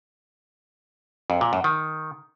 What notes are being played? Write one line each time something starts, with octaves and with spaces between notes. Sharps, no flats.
F2
A#2
F#2
D#3